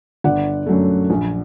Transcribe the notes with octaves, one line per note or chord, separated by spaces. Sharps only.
G1 D5 F#5
F#2 F#3 A3
A#1